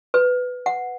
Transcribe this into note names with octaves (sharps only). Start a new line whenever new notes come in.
B4
F#5